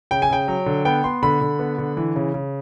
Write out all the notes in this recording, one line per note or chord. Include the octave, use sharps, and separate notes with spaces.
C#3 G5
G#5
C#3 G5
F#3
D3
B3 G5
B3 C6
D3 B5
D3
B3
D3
E3
C#3
C#3